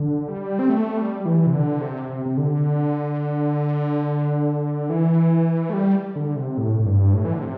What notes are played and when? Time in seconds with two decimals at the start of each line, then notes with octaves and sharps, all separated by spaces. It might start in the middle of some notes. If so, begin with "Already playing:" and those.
Already playing: D3
0.28 G3
0.59 C4
0.70 A3
0.98 G3
1.20 G3
1.26 E3
1.46 C3
1.53 D3
1.81 C3
2.09 C3
2.26 C3
2.37 D3
4.90 E3
5.70 A3
5.73 G3
6.16 D3
6.36 C3
6.58 A2
6.79 A2
6.85 G2
7.14 A2
7.25 E3
7.33 D3
7.42 C3